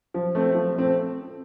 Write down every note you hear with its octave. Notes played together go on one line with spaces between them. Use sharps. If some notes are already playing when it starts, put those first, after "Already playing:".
F3
A3 C4
F3
A3 C4